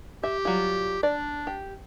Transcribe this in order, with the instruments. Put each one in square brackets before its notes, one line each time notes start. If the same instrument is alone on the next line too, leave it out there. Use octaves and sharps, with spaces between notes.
[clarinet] G4 [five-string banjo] E5
[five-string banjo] F#3 G3 F4
[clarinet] D4 [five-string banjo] D5
[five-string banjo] G4